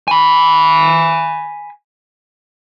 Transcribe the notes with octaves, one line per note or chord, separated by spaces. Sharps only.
G#5 B5